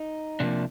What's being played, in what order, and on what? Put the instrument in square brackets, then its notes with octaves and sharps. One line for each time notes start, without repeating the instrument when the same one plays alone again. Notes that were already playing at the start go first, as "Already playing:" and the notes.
Already playing: [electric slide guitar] D#4
C3 F3 A#3 D4